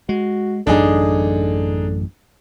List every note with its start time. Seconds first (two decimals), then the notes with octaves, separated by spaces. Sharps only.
0.09 G#3 F#4
0.67 A1 F#2 D3 D4 D#4 G#4